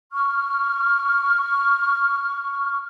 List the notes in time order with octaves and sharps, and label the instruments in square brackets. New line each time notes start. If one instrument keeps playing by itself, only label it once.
[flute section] C#6 F6